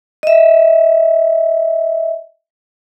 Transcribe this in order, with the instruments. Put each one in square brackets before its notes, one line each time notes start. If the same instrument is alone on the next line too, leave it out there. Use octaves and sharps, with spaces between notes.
[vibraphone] D#5 E5